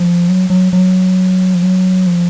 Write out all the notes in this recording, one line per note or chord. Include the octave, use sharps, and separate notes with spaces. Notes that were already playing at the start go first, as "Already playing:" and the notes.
Already playing: F3
F#3
F#3
F#3
F3
F#3
F3